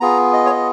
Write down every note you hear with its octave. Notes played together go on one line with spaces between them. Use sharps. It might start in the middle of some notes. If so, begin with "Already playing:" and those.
B3 F4 G#4 A#5
D#5
C#5
D#5